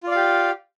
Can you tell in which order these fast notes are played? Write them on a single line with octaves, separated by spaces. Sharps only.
F4 D5 F5 G4